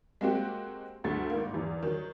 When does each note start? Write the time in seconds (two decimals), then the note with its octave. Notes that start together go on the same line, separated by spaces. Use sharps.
0.21 G#3 A#3 C4 F#4 G4
1.04 D2 A3 A6
1.30 G#1 A#3
1.54 E2
1.83 D#3 F#3